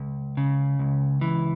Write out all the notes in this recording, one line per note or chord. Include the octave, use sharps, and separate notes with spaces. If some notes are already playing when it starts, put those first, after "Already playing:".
Already playing: C#2
C#3
C#2
E3